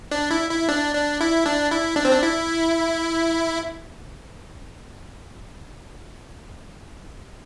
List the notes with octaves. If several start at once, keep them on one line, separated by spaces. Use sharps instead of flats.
D4
E4
E4
D4
D4
E4
D4
E4
D4
C4
D4
E4